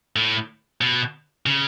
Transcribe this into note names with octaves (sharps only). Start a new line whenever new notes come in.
A2
B2
C#3